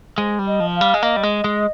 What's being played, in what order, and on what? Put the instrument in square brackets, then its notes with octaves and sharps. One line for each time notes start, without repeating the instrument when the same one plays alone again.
[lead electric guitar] G#3 [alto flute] C5
[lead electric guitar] G3
[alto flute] D#5
[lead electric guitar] F3
[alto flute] F5
[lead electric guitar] G3
G#3
[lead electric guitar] A#3 [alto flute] D#5
[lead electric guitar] G3
G#3
G#3